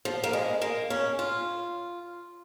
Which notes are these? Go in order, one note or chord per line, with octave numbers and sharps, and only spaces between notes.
F3
A#3
G#3
A#3
C#4
F4